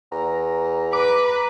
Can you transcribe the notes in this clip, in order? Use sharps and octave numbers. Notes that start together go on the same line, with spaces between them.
E2 A#5
B4 D6